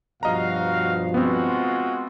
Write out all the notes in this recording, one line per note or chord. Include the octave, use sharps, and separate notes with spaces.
G2 B2 F3 F#4 D#5 F5 A#5
G#3 B3 C4 F4 F#4